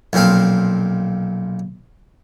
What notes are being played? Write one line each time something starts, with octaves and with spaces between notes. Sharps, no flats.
B1 A#2 F3 C4 F5